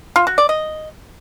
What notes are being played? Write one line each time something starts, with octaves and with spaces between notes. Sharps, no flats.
F4
F#4
D5
D#5